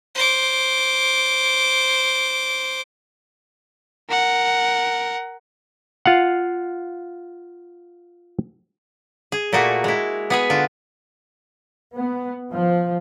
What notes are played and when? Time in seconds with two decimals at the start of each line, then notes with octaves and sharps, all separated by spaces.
0.15 C5 D6
4.09 A#4 F#5
6.06 F4 F5 F#5
9.32 G#4
9.53 A#2 A3 A#3 F#4 G#4
9.84 G#3 E4
10.30 B3 G#4 B4
10.50 D3 F4
11.97 B3
12.52 F3